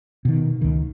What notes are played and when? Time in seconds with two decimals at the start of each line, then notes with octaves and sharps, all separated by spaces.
0.25 B2 D#3
0.62 C#2 D#3